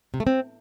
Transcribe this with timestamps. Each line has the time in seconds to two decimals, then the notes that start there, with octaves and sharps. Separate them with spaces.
0.14 C3
0.20 A3
0.27 C4